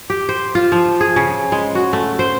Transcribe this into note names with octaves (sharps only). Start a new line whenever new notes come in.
G4
C5
F4
F3
G#4
C#3
G#3
F#4
A3
C5